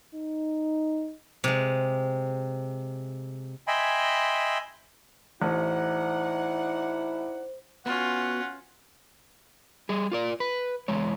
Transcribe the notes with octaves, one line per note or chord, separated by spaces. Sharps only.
D#4
C3 G#3
D#5 E5 G5 G#5 B5 C6
A1 D#4 E4 C5 D5 F#5
B3 C#4 F4 F#4 F#5
G3 G#4
F4 A#4 D5
B4
E2 G#3 C#5